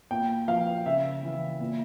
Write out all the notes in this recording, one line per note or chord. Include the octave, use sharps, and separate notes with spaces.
A#2 G5
F3 F5
C#3 E5
E3
A#2